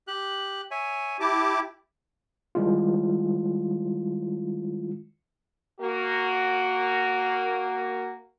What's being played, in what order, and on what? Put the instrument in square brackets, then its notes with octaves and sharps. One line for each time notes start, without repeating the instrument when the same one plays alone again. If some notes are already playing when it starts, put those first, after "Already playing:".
[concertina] G4 F#6
C#5 E5 G#5
[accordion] E4 G4 D6 [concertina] A5
[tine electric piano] D#3 G3 G#3 E4 F4
[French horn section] A#3 F#4